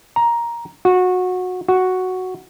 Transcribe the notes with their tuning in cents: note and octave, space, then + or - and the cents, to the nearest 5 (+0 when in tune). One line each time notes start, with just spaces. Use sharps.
A#5 +10
F#4 -20
F#4 +0